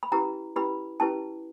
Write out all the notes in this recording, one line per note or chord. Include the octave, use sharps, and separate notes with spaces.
B5
C#4 E4 G4 B4 A#5
C#4 E4 G4 B4 B5
C#4 E4 G4 B4 A5